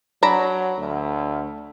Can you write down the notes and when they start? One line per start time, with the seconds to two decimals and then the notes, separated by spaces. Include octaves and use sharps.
0.23 F#3 D4 A#5 B5
0.78 D2